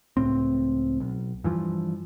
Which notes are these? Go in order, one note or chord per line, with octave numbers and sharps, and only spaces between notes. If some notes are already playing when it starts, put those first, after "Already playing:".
C#2 A2 C4
B1
G2 E3 F3